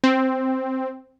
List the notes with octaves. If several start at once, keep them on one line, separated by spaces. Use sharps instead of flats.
C4